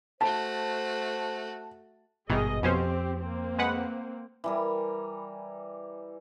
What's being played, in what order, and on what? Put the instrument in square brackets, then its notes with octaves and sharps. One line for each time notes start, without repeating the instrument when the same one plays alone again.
[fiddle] A3 F#4 [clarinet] C5 [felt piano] A5
[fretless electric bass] G#1 G2 B2 [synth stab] D#3 E3 [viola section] G#4 D#5
[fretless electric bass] F2 [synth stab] B2 C#4 C5 [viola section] C4 G4
[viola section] A#3 C4
[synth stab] G#3 B4 F#5
[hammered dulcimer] E3 G3 A#4